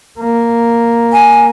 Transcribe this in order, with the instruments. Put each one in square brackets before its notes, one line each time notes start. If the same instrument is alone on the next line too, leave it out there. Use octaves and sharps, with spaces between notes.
[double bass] A#3
[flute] G#5